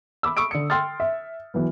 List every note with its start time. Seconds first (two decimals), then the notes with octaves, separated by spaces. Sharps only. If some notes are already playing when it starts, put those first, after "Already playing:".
0.23 B5 D6 E6
0.37 B5 C#6 D#6 E6 D7
0.51 D3 C#7
0.70 G5 C6 D#6 F6 A6
1.00 E5
1.54 E3 F#3 B3